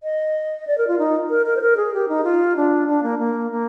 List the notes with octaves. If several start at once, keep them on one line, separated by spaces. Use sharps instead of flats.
D#5
D5
A#4
F4
D#4
A#4
A#4
C5
A#4
G#4
G4
D#4
F4
D4
D4
A#3
A#3
A#3